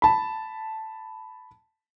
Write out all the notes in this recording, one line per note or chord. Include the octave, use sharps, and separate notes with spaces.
A5 B5